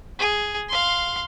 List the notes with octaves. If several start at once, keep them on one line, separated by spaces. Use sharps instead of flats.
G#4
F5 C6